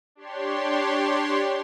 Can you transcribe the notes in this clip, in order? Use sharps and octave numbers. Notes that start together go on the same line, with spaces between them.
D4 G4 C#5 C6